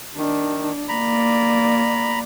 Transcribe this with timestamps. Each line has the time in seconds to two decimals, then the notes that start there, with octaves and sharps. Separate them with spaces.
0.17 D#3 D4
0.89 A#3 D5 A#5 B5